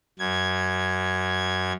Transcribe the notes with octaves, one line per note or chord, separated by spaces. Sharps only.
F#2 G#6